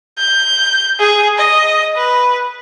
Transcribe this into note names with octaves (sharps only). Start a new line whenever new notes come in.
G6
G#4
D#5
B4